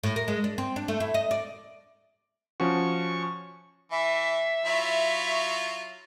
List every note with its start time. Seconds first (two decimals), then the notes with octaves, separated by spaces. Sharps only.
0.03 A2
0.16 A#4
0.28 G#3
0.44 D4
0.58 C4
0.76 D4
0.88 A3
1.00 E4
1.14 D#5
1.31 D5
2.60 F3 C#4 F#4 C#6
3.91 E3 E5
4.65 F#3 E4 F4